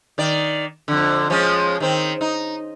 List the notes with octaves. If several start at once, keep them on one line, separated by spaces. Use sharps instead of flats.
D#3 D5
F2 D3
F3 G#3 C#4
D#3 C4
D#4